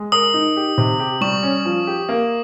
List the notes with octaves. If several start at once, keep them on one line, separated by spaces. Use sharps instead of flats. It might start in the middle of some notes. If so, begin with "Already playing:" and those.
Already playing: G#3
A#4 D#6
D#4
G4
C3
G4
G3 C#6
C#4
F3
G4
A#3